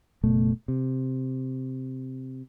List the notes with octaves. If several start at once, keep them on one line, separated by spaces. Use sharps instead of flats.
F#1 B2 A3
C3